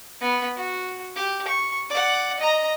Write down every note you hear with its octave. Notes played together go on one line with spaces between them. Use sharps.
B3
F#4
G4
C#6
D5 F#5
D#5 A#5